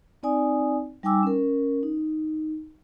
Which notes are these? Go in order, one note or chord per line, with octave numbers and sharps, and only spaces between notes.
C4 D#4 D5 G#5 D#6
G3 D#4 G5 G#5 D6 E6
C#4 A#4
D#4